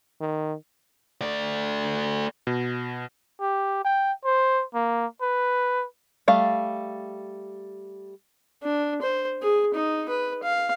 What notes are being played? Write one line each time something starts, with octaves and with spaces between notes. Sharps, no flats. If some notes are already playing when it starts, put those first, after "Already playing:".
D#3
A3 D5
B2
G4
G5
C5
A#3
B4
G3 A3 F5
D4
C5
G#4
D#4
B4
F5